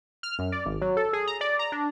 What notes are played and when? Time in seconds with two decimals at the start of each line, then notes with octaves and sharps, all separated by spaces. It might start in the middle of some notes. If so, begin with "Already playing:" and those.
0.23 F6
0.39 F#2
0.52 D5
0.66 G#1
0.81 F#3
0.97 A4
1.13 G#4
1.27 A#5
1.41 D5
1.59 A#5
1.72 D4